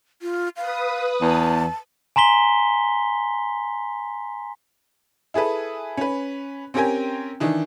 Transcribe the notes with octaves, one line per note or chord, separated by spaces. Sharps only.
F4
B4 F5 D#6
E2 A5
G#5 A#5 C6 B6 G7
E4 G#4 A4 B4
C#4 B4
C4 C#4 G4 A#4 G5 G#5
D#3 E3 D4